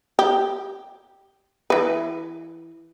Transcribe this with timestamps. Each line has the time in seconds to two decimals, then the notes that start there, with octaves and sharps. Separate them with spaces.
0.19 G4
1.70 E3 B4